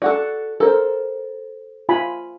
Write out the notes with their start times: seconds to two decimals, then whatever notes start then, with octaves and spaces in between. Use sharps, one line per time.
0.02 F#4 A4 D5 F#5
0.60 A4 A#4 C5
1.89 F4 G#5 B5